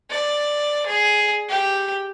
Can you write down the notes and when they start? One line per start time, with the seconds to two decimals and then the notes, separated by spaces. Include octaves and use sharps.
0.11 D5
0.87 G#4
1.49 G4